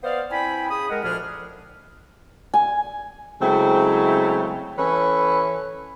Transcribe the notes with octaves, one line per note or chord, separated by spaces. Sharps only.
B3 C5 D5 D#5 F5
C4 E4 G5 G#5 B5
C#3 G#4 B5 D#6
G#3 A#4 F#5
D2 A#2 F3 D4 G#4 F6
G#5
C#3 F#3 G#3 A3 C4 E4
E3 C#4 A4 B4 C#5